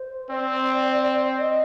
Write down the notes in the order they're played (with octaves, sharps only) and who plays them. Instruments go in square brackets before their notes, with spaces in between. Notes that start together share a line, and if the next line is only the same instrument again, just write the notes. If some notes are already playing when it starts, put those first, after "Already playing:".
Already playing: [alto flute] C5
[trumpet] C4 [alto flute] D5
[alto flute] D5
D#5